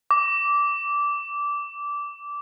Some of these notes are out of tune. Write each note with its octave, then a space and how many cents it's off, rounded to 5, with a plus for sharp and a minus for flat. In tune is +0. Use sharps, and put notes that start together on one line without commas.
D6 -15